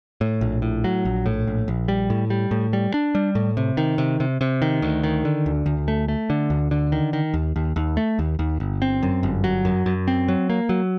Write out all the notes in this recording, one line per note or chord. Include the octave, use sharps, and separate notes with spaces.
A2
A#1
A2
F#3
A#1
A2
A#1
A#1
G3
A2
G3
A2
G3
D4
G3
A2
C3
D#3
C3
C3
C3
D#3
D2
D#3
D3
D2
D2
A3
A3
D3
D2
D3
D#3
D#3
D#2
D#2
D#2
A3
D#2
D#2
G1
C4
F#2
G1
F#3
F#2
F#2
C4
F#3
A#3
F#3